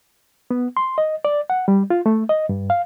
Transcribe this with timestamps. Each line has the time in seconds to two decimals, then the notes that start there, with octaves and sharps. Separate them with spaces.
0.51 B3
0.77 C6
0.98 D#5
1.25 D5
1.50 F#5
1.68 G3
1.90 F4
2.06 A3
2.29 D#5
2.49 G2
2.70 F5